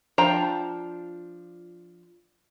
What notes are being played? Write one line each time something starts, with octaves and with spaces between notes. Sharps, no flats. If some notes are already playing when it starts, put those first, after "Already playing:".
F3 D4 G5 A#5